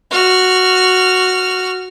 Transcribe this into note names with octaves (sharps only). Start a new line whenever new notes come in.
F#4 F6